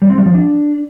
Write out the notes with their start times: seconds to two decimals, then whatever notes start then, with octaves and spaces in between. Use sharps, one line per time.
0.02 G3
0.10 C4
0.18 G3
0.26 F3
0.34 D4